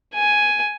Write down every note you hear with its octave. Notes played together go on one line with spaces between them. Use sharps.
G#5